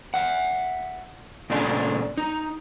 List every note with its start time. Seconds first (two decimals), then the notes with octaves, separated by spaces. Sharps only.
0.14 E5 F#5
1.50 A#2 C#3 A3 D4 C5 G#5
2.17 D#4